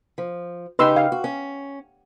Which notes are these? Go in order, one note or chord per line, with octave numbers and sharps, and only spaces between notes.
F3
C#3 D#4 G4 B4 C6 E6
F5
F#4
C#4